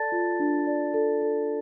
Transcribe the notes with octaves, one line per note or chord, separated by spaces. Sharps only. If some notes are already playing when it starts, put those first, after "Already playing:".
Already playing: A4 D5 A5 A6
F4
D4
D5
A4
A4